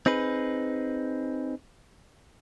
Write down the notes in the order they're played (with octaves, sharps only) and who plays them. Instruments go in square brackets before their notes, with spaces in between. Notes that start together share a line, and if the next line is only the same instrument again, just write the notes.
[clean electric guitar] C4 D#4 G#4 B4